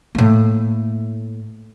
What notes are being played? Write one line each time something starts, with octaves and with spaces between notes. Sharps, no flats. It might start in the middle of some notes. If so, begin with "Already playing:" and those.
A2 A#3